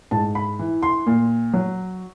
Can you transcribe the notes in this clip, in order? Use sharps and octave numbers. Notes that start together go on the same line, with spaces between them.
G#2 A5
B5
E3
C6
A#2
F#3